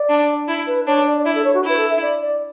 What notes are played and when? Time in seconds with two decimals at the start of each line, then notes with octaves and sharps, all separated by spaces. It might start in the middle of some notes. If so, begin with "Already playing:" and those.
Already playing: D5
0.09 D4
0.48 E4
0.67 B4
0.87 D4 C#5
1.06 D5
1.17 D5
1.25 E4 E5
1.35 A4
1.44 C#5
1.54 F#4
1.64 E4 B4
1.77 A4
1.90 E5
2.02 D5
2.22 D5